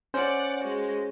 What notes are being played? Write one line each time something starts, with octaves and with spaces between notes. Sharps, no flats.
C#4 C5 D5 F#5
G#3 F#4